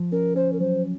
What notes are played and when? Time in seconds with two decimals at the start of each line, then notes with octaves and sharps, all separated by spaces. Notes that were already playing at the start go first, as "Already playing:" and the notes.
Already playing: F3
0.12 C#4 A#4
0.36 C#4 C5
0.53 A#4
0.60 F#3 C5